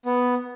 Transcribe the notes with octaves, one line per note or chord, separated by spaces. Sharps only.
B3